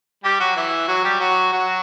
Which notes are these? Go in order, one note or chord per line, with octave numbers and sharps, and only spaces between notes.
G3 G4
F#3 F#4
E3 E4
F#3 F#4
G3 G4
F#3 F#4
F#3 F#4